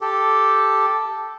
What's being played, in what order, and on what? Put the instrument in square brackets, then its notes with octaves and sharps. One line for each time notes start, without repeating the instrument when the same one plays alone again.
[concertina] G4 A4